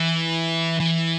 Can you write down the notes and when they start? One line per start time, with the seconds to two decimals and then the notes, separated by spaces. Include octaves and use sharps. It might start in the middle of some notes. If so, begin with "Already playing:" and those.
Already playing: E3
0.80 E3